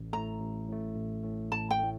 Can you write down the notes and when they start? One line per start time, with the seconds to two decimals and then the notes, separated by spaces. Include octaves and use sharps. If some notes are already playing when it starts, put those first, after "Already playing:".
Already playing: A1
0.13 A2 A3 A#5
0.40 A1
0.69 A2 A3
0.96 A1
1.24 A2 A3
1.52 A1 A5
1.71 G5
1.79 A2 A3